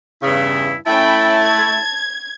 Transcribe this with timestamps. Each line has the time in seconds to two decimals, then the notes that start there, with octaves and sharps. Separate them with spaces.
0.23 E2 G2 C#3 E4
0.87 A3 C#4 E4 G5 A5 B5
1.42 G#6